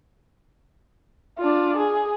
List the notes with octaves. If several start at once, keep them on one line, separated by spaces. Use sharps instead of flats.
D4 F4
G#4